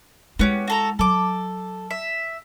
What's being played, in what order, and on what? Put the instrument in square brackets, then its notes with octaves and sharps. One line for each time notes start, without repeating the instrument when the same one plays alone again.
[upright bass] G#3 E4 [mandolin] B3 C#4 G4
[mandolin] F#4 A4 A#5
[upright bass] F#3 [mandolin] A4 D6
[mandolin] E5